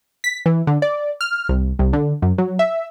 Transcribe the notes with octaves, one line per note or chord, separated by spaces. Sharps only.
B6
E3
D3
D5
F6
C2
C2
D3
F#2
F#3
E5